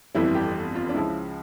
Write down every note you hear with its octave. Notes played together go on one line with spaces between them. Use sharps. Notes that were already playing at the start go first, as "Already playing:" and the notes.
G1 F2 E3 G3 E4
G4
F4
D4
C#2 C#3 F3 E4